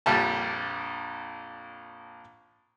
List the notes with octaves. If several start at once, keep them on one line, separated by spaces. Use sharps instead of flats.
A#1 F2 G3 A5